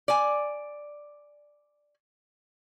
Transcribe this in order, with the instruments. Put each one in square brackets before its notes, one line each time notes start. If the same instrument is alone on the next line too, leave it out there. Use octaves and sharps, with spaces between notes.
[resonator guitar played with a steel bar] D5 G#5